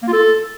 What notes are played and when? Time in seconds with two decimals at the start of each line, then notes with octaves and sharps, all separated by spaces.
0.03 A#3
0.08 F4
0.13 A4